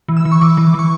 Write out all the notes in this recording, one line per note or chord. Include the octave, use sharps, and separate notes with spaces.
E3
E6
E3
C#6
E3 D6
E3
E3 C#6